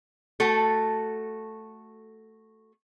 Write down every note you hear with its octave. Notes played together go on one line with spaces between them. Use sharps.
A3 F#4 A4